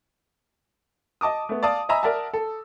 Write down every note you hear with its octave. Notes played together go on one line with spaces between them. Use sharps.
D#5 A5 D6 D#6
A3 B3
D5 F5 A5 D#6
D#5 E5 G#5 A#5 B5 E6
A#4 D5 E5 F#5 A5
A4